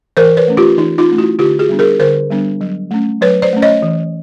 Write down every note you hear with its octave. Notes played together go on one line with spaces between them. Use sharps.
E3 A#4 C5
B4 C#5
A3 C#4
F4 G4
E3 D#4
D#4 F4
A3 C#4
E4 F#4
D3 F4 G4
F#4 G#4
G3 B3 D4
G#4 A#4
D3 A#4 C5
G3 B3 D4
F#3
A3 C#4
F#3 B4 C#5
C5 D5
A3 C#4
C#5 D#5
E3